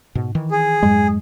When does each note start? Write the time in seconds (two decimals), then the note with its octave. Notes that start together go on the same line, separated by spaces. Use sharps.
0.15 G#2 B2
0.35 D#3 E3
0.51 G#4
0.83 F2 G#2 F#3 G#3